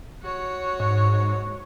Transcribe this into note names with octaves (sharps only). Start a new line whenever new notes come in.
F#4 C#5
G#2